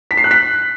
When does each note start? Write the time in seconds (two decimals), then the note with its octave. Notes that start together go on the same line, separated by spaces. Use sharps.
0.11 B6
0.17 C7
0.24 F#6
0.31 B6